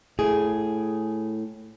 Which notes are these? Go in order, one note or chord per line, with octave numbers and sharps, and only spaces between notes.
A2 G#4